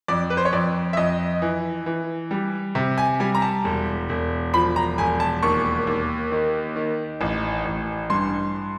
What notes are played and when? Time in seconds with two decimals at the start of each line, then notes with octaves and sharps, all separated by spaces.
0.08 F2 D5
0.30 B4
0.37 C5
0.45 C#5
0.53 F2 D5
0.93 E5
0.97 F2 D#5
1.42 E3
1.86 E3
2.31 G3
2.75 C3
2.98 G#5
3.20 G3 G#5
3.35 A#5
3.42 A5
3.64 E1
4.09 E1
4.53 F3 B5
4.76 A#5
4.98 E1 G#5
5.20 A5
5.43 D#2 C#6
5.87 D#2
6.32 D#3
6.76 D#3
7.21 A1
7.65 A1
8.10 G2 C6